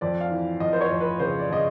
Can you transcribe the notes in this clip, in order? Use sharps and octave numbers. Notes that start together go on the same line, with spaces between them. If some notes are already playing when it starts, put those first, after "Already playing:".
F2 D5
F5
E3
F2 D#5
C5
C#5
F2
B4
C#3 C5
D5
C#3 D#5